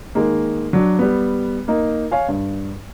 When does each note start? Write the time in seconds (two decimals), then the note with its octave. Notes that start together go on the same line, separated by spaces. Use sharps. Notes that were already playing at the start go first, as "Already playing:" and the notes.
0.15 D#3 G#3 A#3
0.73 F#3 D4
0.99 G3 B3
1.68 A#3 D#4
2.11 C#5 F5 G#5
2.29 G2